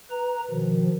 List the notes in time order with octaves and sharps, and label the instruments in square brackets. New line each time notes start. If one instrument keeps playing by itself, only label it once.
[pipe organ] B4 A#5
B2 D#3 F3